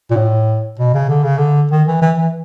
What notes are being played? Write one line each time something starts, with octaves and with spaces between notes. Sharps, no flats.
A#2
A2
B2
C#3
D3
C#3
D3
D#3
E3
E3
E3